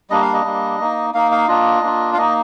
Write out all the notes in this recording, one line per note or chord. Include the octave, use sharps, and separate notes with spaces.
G3 A#3 D4 D#5
F5
D#5
G3 A#3 D4
A#3 D#4
A#3 D#4 F5
F5
A#3 D4 F4 D#5
A#3 D4 F4
F5
A#3 D#4 D#5